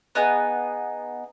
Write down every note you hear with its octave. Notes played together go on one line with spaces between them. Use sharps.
B3 D#4 G#4